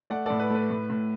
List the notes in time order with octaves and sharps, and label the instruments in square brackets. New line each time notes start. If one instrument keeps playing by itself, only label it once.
[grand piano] A3 D5 F#5
A2 A4 D5
B4
A3 B4
A2
A2